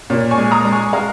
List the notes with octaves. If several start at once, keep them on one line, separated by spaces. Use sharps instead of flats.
A#2 C#5
G#5 C#6
G#3
A#5 D#6
G#3
G#5 C#6
G#3 F5 A#5